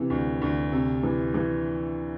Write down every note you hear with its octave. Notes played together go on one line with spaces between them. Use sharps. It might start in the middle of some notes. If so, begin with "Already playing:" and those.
Already playing: C3 E3
D2
D2
C3
E3
E3